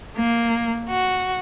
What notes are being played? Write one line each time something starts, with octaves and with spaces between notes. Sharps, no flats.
A#3
F#4